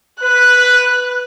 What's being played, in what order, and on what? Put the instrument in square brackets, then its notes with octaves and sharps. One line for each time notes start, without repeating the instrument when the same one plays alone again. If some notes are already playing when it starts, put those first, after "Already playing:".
[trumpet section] B4 [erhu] F#6